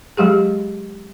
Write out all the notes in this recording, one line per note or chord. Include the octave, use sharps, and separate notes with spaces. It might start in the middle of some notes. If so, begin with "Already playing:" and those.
F#3 G#3 G4 G#4